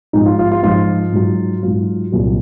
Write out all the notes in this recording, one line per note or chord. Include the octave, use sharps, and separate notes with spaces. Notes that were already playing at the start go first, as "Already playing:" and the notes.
G#2 F3 D#4
F4
F4
F4
G#2 F3 F4
G#2 F#3
G#2 F#3 F4
C2 A#2 F#3